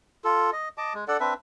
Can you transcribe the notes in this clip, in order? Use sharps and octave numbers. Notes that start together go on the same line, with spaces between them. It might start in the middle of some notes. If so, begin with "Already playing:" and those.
F4 A4
D#5
D#5 A5 D6
G#3
D4 A4 D5 F#5
C4 D4 B4 E5